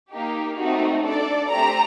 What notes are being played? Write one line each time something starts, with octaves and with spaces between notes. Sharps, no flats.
A#3 D#4 G4
A3 C4 D#4 F#4
D4 A4 D5
A3 C4 G4 A#5